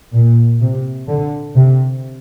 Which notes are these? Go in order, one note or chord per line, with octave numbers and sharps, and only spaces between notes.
A#2
C3
D3
C3